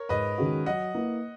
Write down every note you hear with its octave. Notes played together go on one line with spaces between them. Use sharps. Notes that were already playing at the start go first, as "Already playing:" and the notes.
Already playing: A#4 C#5
G#2 B4 D#5
D#3 G#3 C#4 F#4
F#3 D#5 F#5
A#3 E4 B4